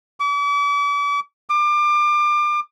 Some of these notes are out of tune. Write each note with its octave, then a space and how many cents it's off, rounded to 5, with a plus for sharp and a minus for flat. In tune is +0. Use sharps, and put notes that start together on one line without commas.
D6 -40
D6 +30